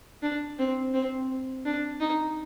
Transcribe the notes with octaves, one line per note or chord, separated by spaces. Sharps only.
D4
C4
C4
D4
D#4